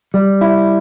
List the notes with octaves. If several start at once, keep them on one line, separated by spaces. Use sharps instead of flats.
G3
E4